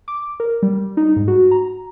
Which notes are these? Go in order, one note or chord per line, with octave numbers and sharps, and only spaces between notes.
D6
A#4
G3
D#4
G#2
F#4
A#5